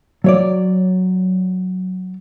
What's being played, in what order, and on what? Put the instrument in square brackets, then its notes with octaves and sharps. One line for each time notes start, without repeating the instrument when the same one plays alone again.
[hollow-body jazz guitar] F#3 C#5 D5